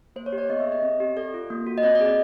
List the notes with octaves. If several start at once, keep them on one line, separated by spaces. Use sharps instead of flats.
A#3 C5
C#5
G4
D5
B3 D#5
E5
G#4
D#5
C4
G4
A4 D5
F4
A#3
F#4
D#5
C4 D5
D5
G#4 D#5